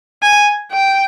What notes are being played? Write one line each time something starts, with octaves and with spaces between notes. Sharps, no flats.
G#5
G5